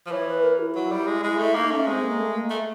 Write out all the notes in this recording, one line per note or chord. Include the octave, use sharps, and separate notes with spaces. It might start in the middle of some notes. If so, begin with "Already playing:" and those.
F3
E3 C#5
B4
A#4
E4
F#3
G3
G#3
G#3
A3
A#3 D#4
A3 C#4
G#3 C4
A#3
A3
A#3
A3